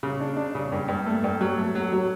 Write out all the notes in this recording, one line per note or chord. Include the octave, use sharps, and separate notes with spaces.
C#3
D4
D4
C#3
G2
G2
A3
G2
F#3
A3
F#3
F#3